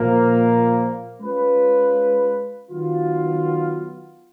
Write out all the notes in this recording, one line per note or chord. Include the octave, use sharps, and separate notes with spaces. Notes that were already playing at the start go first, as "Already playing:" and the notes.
Already playing: A#2 F3 A#3
G#3 C#4 F4 B4
D#3 F#3 B3 F4